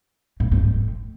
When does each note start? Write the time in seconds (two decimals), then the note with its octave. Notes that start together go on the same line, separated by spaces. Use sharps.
0.40 A2
0.52 G#2
0.63 A2